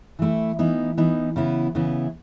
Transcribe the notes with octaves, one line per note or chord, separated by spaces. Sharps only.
E3 A3 E4
E3 B3 D#4
E3 B3 D#4
C#3 E3 B3 E4
C#3 E3 B3 E4